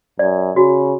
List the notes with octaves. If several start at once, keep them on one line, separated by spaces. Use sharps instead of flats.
F#2 D5
C#3 F#4